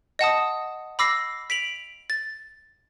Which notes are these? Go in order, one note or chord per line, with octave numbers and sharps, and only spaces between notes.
D#5 F#5 A5 D#6
B5 D6 E6 A#6 C7
B6 D7 F7 F#7
A6